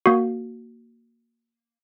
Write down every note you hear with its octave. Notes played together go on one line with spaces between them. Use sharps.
A#3 F#4